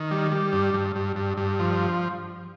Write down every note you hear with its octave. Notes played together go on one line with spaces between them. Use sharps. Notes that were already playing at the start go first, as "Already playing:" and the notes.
Already playing: D#3
G3
G3
G2
G2
G2
G2
G2
F3